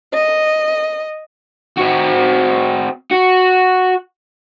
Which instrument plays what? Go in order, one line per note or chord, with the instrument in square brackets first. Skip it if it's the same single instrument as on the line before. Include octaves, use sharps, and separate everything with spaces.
[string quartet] D#5
[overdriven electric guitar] C4 F#4
F#4